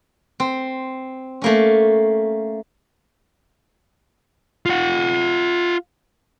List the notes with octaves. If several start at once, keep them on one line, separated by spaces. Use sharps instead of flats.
C4
A3 A#3 C#4
F4 F#5